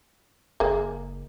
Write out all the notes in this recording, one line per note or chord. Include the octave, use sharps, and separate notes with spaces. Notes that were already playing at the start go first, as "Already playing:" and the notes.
F#1 G#3 A#3